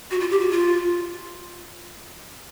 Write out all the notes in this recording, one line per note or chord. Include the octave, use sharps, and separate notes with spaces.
F#4
F4
G4
F#4
F4